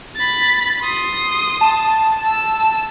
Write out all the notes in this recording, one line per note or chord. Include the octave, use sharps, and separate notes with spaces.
B5 A6
C6 D#6
A5
E6